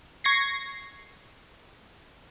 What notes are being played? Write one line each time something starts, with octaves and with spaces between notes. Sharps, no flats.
C#6 G#6 A#6 C7